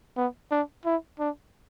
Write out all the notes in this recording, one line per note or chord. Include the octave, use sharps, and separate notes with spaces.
B3
D4
E4
D4